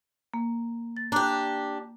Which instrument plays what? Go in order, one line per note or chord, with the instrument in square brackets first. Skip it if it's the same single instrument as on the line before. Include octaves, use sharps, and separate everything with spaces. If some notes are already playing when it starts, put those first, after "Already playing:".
[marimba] A#3
A6
[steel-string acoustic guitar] D4 G4 [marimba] A#5 D6 F#6